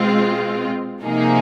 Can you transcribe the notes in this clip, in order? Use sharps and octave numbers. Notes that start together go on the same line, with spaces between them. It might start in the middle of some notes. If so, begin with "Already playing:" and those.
Already playing: B2 G#3 C4 F4
C3 F3 A#3 D#4 G#4